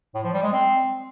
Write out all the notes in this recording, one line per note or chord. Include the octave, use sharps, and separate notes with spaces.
A2
F3
G3
G#3
C4